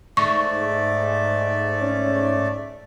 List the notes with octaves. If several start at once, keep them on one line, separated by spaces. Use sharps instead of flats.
G#2 A3 D5 C#6
C#4